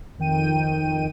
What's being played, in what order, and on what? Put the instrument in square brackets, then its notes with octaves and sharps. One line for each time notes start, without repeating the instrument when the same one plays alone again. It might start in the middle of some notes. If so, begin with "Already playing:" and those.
[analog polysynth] F2 D#3 G5 D#7